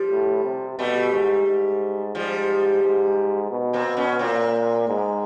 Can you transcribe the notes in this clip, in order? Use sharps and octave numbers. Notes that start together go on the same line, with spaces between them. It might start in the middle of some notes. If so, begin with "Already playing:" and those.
Already playing: F3 G3
A2
C3
B2 G3 A3
G#2
G#2
G#2 F3 G3
G#2
B2
A#3 C4
B2
B3 C#4
A#2 A#3 C4
G#2